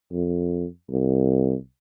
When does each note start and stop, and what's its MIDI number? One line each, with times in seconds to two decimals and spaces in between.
0.12 0.65 41
0.90 1.55 36